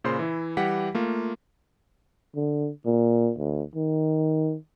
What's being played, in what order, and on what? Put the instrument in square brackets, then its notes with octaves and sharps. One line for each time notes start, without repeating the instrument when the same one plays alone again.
[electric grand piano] A#2 C#3 C5 B5 C6
E3 E4
E3 G3 G4 F#5 B6
A3 A#3 F4
[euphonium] D3
A#2
D2
D#3